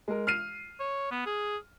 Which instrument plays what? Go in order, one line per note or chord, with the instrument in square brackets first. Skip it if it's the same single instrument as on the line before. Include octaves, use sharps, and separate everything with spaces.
[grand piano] G#3 A#4
F6 C7 D#7
[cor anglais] C#5
B3
G#4